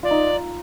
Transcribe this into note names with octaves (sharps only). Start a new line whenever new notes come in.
F4 D5
D#4